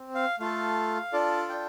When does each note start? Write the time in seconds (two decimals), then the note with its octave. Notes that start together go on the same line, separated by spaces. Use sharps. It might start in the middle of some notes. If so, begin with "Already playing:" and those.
Already playing: C4
0.15 F5
0.39 A3 F4 A4 F5
1.13 D4 F4 A4 D5
1.49 G5